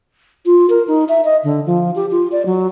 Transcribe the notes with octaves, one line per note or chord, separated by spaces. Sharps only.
F4
A#4
D#4
E5
D#5
D3
F3
G4
F4
D5
F#3